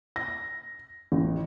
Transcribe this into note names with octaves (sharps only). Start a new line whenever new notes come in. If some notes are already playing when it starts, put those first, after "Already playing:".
A#6
A1